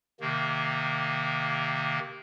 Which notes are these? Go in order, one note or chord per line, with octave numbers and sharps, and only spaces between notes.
C3 D#3 A#3